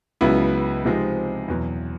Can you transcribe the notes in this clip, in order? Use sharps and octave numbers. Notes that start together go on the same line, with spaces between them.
C#2 C#3 F#3 B3 E4
C3 F3 G#3 C4 D#4
E2 B2 F#3